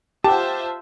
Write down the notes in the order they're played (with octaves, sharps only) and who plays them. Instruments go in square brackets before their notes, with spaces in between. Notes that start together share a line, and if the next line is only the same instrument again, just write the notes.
[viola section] F4 C5 E5 [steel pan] G4 [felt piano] F#5 G5 D6 [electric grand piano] A5